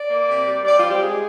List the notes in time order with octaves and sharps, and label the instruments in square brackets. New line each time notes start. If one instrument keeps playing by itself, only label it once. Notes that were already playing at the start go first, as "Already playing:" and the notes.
Already playing: [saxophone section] D5
A#3
C3
G3
G3 D5
F4
C4
G4
G#3 G#4